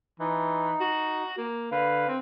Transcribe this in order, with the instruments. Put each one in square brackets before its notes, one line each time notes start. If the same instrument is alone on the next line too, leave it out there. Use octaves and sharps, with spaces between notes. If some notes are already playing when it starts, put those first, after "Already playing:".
[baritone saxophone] E3 [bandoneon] D#4
[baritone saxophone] F#4
A#3
[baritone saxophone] D3 [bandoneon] B4 F5
[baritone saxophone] C4